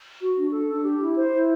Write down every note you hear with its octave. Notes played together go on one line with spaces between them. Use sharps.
F#4
D4
A4
D4
G4
E4
C5
E4